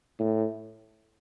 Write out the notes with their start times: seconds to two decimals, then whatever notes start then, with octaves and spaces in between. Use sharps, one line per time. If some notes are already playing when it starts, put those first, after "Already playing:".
0.19 A2